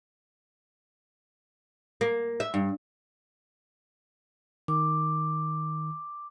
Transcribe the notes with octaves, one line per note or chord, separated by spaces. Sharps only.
A#3
E5
G2
D#3 D6